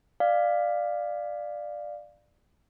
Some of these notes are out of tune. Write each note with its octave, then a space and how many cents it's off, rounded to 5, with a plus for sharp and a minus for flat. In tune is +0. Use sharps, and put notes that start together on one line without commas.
D5 +15 F5 +0